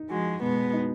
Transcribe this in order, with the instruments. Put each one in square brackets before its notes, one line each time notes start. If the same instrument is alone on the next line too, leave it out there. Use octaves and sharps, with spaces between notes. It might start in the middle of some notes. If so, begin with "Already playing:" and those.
Already playing: [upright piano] D#4
[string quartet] F3 G#3 [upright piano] F#4
[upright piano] B2 [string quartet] G#3 B3
[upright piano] D#4